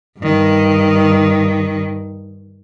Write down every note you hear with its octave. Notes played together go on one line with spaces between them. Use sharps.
G2 D#3